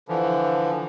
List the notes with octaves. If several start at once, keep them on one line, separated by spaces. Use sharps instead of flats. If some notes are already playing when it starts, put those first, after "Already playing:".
D3 E3 F3